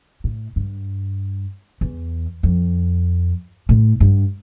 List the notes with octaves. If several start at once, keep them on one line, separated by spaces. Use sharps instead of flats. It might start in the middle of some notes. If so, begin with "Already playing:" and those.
A2
G2
E2
F2
A2
G2